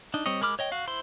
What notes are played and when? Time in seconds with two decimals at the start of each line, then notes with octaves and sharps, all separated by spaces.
0.14 D4 D#4
0.26 G3 C4 C#5 D#5
0.41 G#3 A#4 B5 D6 F6
0.59 C#5 D#5 G5
0.72 F#4 F5
0.87 E4 C5 C6